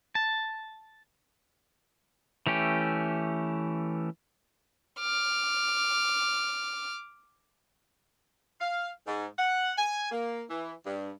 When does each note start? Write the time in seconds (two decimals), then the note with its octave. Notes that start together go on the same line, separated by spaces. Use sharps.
0.15 A5
2.47 E3 A3 C#4 G4
5.00 D6 F6
8.61 F5
9.06 G#2
9.39 F#5
9.78 G#5
10.11 A#3
10.50 E3
10.86 G2